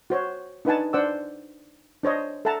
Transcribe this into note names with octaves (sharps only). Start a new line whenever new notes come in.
F#4 C5 C#5
D4 D#4 B4 F#5 G#5 A5
D4 C5 D5 F#5 D6 E6
D4 C5 C#5 D#5
A4 E5 F#5 A5 A#5